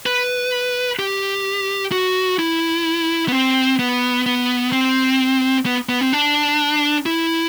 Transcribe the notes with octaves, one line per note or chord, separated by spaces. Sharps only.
B4
G4
F#4
E4
B3
C4
B3
B3
C4
B3
B3
C4
D4
E4